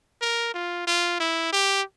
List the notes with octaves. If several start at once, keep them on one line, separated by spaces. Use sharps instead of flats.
A#4
F4
F4
E4
G4